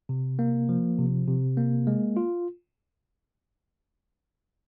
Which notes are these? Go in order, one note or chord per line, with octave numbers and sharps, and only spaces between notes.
C3
A#3
F3
C3
C3
A#3
G#3
F4